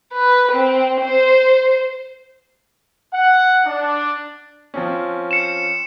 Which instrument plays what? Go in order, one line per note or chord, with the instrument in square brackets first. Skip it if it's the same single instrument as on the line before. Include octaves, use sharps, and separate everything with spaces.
[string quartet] B4
C4
C5
[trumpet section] F#5
D4
[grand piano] F3 C4 C#4
[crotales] C#7 E7